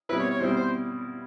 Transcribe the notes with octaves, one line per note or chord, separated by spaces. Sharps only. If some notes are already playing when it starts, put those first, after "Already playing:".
B2 G3 C4 E4 B4
C#5
C#5
B2 G3 C4 E4 C5
C5